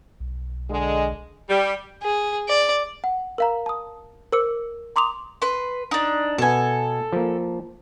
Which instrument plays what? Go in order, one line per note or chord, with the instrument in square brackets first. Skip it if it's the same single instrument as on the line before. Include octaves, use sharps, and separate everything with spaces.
[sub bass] B1
[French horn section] D3 G#3
[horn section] G3
[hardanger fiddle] G#4
D5
[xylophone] F#5
A#4 F5 A#5
A5 D#6
A#4 C5 D6 E6 C#7
A#5 C6 D6 D#6 F7
[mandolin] B4 C6
D4 D#4
[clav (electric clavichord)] B2 B3 [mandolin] A4 G#5
[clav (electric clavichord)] F3 A#3